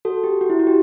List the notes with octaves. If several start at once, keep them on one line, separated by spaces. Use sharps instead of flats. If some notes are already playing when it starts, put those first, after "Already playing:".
F#4 A4
G4
F#4
E4
F#4
G4